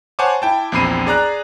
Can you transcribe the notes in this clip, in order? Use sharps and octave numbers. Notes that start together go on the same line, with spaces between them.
C5 C#5 F#5 G#5 A5 D6
E4 G5 A5
A#1 E2 C4 B5 C7 D#7
G#4 D5 A#5 F#6